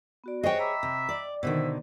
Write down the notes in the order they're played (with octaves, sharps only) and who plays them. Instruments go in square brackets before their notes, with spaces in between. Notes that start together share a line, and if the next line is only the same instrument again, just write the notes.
[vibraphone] B3 F#4 D5
[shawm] F#4 [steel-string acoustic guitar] G#4 C#5 [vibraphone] C5 [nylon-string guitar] D#5 G5
[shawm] E5 [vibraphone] A#5 B5 D6
[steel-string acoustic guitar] C3
D5
[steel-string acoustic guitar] B2 D3 D#3 [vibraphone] C5 [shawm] E5